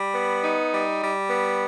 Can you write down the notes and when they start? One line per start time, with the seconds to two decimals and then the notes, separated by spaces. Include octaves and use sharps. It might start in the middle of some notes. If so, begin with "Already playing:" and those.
Already playing: G3
0.14 B3
0.44 D#4
0.73 G3
1.01 G3
1.30 B3